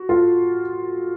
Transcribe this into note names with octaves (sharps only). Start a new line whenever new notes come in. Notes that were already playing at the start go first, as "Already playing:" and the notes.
Already playing: F#4
F4 A4